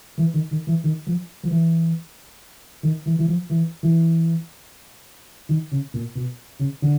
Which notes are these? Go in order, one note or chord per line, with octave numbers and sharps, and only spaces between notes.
E3
D#3
D#3
E3
D#3
F3
F3
E3
D#3
E3
E3
F3
E3
E3
D#3
C#3
A#2
B2
C#3
D3